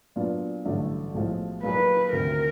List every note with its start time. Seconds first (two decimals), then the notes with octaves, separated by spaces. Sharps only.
0.16 A#2 F#3 B3 D4 F4
0.65 A1 G2 D3 F#3 A3
1.14 B1 A2 F3 G#3
1.63 A#2 F#3 A#3 D#4 G#4 B4
2.13 D2 C3 D#3 A#4